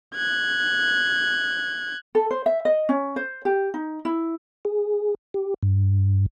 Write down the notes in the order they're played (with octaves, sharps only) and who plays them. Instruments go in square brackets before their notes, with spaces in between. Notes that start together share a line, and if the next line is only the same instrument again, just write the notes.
[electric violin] F#6 G#6
[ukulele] A4
C5
E5
D#5
C#4
C5
G4
D#4
E4
[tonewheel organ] G#4
G4
G2